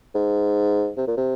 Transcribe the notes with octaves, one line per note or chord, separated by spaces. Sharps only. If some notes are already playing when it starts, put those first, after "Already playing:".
G#2
C3
A#2
C3